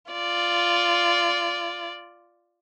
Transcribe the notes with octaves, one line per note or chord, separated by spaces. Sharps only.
F4 D5